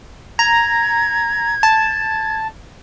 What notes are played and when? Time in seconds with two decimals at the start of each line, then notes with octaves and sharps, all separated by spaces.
0.39 A#5 G#6
1.63 A5